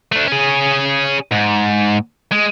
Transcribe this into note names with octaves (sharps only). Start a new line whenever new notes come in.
A3 D4
C#4 G#4
G#2
G#3